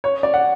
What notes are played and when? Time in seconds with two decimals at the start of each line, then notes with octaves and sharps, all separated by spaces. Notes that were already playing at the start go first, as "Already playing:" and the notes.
0.04 C#5
0.23 D5
0.34 F#5